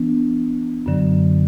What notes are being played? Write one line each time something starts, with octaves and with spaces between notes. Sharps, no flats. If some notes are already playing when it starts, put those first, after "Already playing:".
Already playing: E3 B3 D4
F#2 D3 F#3